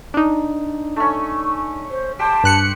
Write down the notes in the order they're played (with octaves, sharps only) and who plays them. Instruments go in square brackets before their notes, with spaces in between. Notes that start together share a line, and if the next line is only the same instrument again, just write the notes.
[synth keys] D4 D#4
[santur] A3 C#4
[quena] C5
[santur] G4 C5 G5 [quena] A5
[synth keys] G2 F#6 C#7